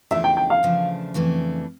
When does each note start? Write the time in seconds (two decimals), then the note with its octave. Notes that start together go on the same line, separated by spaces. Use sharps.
0.11 E2 C#3 F3 A3 D4 E5
0.24 G5
0.37 G5
0.50 F5
0.63 E2 C#3 F3 A3 D4
1.14 F2 C#3 E3 A3 D4